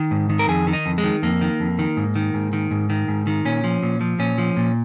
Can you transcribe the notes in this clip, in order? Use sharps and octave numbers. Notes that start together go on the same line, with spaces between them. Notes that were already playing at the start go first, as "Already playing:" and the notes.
Already playing: D#3
G#2
D#3
A#4
F2 G#4
D#3
D#4
F2
G#3
D#3
F2 A#3
D#3
F2
D#3
G#2
D#3
G#2
D#3
G#2
D#3
G#2
D#3
A#2 C#4
F3
A#2
F3
A#2 C#4
F3
A#2